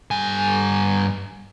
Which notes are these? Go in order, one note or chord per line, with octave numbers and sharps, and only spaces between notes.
G2 G#5